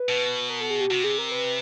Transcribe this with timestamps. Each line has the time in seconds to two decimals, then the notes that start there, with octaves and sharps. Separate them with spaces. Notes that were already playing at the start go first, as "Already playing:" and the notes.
Already playing: B4
0.09 B2
0.50 A#4
0.61 A4
0.70 G#4
0.80 G4
0.90 C3 F#4
1.04 G#4
1.18 A#4
1.32 B4